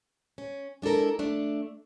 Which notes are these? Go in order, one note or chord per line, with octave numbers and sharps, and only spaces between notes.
C#4
G#3 D4 E4 A4 A#4
A3 D4